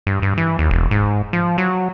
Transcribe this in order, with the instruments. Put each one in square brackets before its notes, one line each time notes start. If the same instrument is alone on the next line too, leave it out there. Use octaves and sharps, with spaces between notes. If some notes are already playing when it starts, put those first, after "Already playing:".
[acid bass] G2
G2
E3
D#2
E1
G#2
F3
F#3